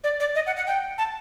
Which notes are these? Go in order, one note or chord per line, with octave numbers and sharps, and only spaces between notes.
D5
D5
D#5
F#5
F#5
G5
A5